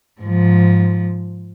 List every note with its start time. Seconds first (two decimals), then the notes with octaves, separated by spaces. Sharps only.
0.21 G#2 F3